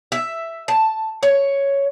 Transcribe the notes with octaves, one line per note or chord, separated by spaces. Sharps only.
E5
A5
C#5